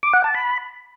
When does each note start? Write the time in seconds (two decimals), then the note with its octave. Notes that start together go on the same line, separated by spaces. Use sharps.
0.03 D6
0.14 F#5
0.24 A5
0.35 B5